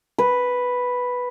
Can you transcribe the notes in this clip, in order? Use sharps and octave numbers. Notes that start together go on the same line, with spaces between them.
B4